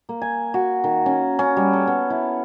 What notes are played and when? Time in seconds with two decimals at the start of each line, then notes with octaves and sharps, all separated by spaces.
0.09 A#3
0.21 G#5
0.54 F#4
0.84 D#3
1.06 C#4
1.39 C#4
1.57 G3
1.73 A4
1.87 B3
2.10 E4